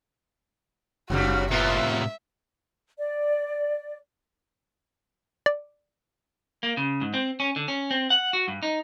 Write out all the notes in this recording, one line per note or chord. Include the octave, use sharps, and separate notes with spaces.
F#1 G2 C#3 G3 F#4
A2 C3 A#3 B3 F4 E5
D5
D5
A#3
C#3
G#2
C4
C#4
D3
C#4
C4
F#5
F#4
G2
D#4